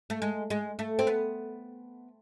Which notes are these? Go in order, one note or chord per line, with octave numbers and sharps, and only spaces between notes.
A3
G#3
G#3
A3
C4
B3